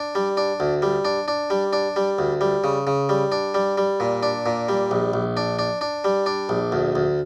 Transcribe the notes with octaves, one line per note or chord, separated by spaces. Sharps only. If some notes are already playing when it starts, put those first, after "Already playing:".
Already playing: D4
G3
D4
D2
G3
D4
D4
G3
D4
G3
D2
G3
C#3
C#3
G3
D4
G3
G3
A#2
D4
A#2
G3
A#1
A#1
D4
D4
D4
G3
D4
A#1
D2
D2